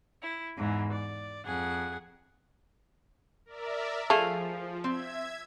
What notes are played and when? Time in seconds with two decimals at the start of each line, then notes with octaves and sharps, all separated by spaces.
0.22 E4
0.56 E2 G#2 E3
0.92 D5
1.45 F2 G#4 F#5
3.46 A#4 D5 E5
4.10 F3 A3 G#4 F5
4.84 C4 E5 G#6